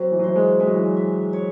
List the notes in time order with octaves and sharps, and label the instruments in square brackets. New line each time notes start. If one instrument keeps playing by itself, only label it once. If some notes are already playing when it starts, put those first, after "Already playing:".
Already playing: [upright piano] F#3 [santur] C4
[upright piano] E3
F#3
[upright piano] E3 [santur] C5
[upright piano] G#3
[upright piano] G#3 [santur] E5
[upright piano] F#3
E3
F#3
[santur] E5
C#5